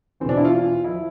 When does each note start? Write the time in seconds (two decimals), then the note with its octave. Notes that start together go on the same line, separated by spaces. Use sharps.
0.20 E2 C4
0.25 B2 D4
0.37 E4
0.45 F4
0.84 F3 E4